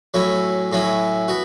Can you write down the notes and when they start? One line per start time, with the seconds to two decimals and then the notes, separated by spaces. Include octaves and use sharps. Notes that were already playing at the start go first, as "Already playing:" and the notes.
0.14 A2 F#3 C#4 E4
0.72 A2 F#3 C#4 E4
1.28 B3 F#4